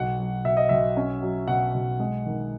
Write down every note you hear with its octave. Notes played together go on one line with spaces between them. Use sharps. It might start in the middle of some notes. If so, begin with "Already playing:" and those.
Already playing: B1 F#5
F#3
B2 E5
D#5
B1 E5
C#4
F#3
B2 F#5
B1
G#3
D#3